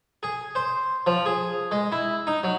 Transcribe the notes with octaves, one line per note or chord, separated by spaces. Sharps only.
G#4
C5
F3
G#4
G#3
E4
D#4
F#3